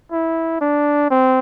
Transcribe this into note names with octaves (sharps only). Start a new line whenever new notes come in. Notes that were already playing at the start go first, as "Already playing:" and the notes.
E4
D4
C4